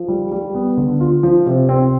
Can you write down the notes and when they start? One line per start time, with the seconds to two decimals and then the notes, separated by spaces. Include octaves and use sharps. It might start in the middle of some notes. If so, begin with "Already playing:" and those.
Already playing: F3
0.08 G3
0.32 G3
0.55 B3
0.77 D3
1.00 F4
1.23 F3
1.47 C3
1.69 C4